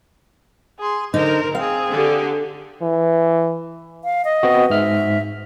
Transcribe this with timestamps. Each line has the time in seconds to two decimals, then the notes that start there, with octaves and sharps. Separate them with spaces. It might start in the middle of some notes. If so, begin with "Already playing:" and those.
0.79 G#4 C6
1.14 D3 D#4 A#4 C5
1.55 C4 G#4 F5
1.91 D3 G4
2.82 E3
4.04 F5
4.25 D#5
4.43 B3 C4 F#4
4.70 G#2 E5 F6